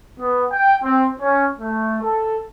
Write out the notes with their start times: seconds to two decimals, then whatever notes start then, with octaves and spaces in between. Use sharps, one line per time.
0.20 B3
0.52 G5
0.83 C4
1.20 C#4
1.60 A3
2.02 A4